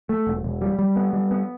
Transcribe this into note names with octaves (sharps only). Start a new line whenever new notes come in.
A3
E1
E1
G3
G3
B3
G3
B3